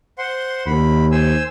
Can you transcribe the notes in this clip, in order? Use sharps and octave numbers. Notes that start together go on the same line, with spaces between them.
C5 F#5 C6
D#2 B5
C5 G#5 E6